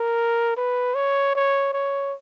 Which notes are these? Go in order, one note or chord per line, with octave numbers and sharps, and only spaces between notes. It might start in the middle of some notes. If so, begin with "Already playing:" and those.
Already playing: A#4
B4
C#5
C#5
C#5